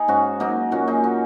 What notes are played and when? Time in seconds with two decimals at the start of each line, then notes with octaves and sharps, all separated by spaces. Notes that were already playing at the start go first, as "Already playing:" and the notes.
Already playing: D#4 G#4
0.08 G#2 C#4 F#4
0.40 F#3 A#3 D#4
0.71 A#2 C#4 F#4
0.88 D#4 G#4
1.04 F#3 C#4